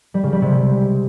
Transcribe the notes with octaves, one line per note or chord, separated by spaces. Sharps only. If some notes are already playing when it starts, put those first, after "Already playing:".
G3
C#3
G3
C3
G#3